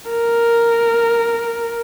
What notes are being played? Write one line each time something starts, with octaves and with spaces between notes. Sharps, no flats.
A#4